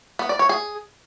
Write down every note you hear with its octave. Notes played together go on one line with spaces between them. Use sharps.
B3
D5
C#5
G#4